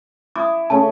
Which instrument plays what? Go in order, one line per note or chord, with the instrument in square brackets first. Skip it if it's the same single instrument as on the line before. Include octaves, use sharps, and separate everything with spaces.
[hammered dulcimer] E4 [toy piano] D6 D#6
[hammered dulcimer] C#3 A3 C#4 [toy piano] A5